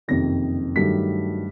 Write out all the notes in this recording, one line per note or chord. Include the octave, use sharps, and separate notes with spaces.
F#1 F2 C3 D#3 A#6
G2 D#3 F#3 A3 B6